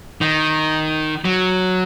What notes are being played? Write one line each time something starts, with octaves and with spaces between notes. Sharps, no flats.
D#3
F#3